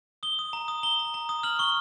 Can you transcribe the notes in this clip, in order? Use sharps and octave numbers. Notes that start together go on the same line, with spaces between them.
D#6 G7
D#6
A#5
D#6
A#5 G7
A#5
A#5
D#6
F6 F#7
C#6 G7